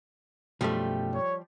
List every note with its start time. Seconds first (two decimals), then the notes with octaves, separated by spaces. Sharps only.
0.61 B1 F#2 F3 G3 A3 G4
1.13 C#5